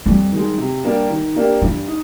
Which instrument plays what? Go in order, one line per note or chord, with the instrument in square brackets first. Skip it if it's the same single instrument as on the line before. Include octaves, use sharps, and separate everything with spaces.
[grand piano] F2 [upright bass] G3
[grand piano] D#3 G#3
C3
G3 A#3 D4 G4
D#3
A#3 D4 G4 A#4
[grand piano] G2 [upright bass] F3
[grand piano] D#4